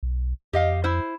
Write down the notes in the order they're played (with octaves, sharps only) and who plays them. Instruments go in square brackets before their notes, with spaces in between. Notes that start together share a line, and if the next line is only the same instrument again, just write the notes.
[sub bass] B1
[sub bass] F2 [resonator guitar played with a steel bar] G4 D#5 F5
[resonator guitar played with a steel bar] E4 C5